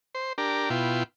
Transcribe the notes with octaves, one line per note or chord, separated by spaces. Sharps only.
C5
D4 G4 A#4
B2 E4 F4 G5